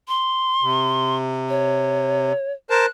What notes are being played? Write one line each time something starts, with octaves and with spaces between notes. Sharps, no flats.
C6
C3
C#5
A#4 C5 A5 F#6